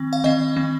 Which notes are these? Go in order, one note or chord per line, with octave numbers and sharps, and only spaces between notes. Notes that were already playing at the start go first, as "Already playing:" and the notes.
Already playing: D#3 C4
F5
D#3 C4 D#5
D#3 C4